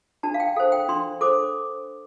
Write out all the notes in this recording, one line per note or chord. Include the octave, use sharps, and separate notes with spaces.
D4 A5
F5
G5
A4 C5 F5
G5
D4 C6
A4 C5 D6